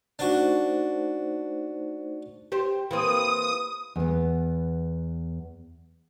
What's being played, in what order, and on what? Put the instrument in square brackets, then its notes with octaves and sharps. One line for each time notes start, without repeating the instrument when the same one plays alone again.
[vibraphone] A3 D#4 C5 [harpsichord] D4 F#4
[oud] G4 C5
[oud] E3 A#3 C4 [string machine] D#6
[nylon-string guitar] E2 B3